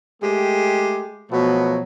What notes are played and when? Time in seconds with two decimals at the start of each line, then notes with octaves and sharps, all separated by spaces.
0.22 G#3 A3 G4
1.31 B2 F3 F#3 A3 B3